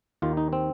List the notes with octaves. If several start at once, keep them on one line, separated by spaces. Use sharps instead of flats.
D#2 D#3 F4
D#4
C4